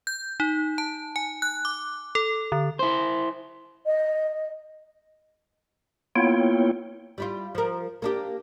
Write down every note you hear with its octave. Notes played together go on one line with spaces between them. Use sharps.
G6
D#4
A5
G#5
F#6
D6
A4
D3
E4 C5
D#5
A#3 B3 E4 F4 C#5 G5
G3 E4 F4
F3 A#4
A#3 D4 G4